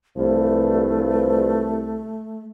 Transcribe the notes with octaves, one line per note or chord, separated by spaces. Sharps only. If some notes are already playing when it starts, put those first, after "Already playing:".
C2 G2 E3 F3 A3